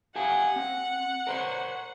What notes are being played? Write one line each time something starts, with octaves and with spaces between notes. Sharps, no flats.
G4 F5 F#5 G#5
C4
A#4 C5 C#5